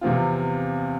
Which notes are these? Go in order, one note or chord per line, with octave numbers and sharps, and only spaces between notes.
E2 C3 F3 C4 F4